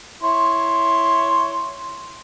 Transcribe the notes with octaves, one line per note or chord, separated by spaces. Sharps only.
E4 C#5 C6